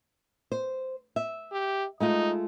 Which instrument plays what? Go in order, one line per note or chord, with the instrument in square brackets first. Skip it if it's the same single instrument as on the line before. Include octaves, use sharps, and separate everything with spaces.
[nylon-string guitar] C5
E5
[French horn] G4
[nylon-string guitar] G#3 A3 F4 [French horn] D#4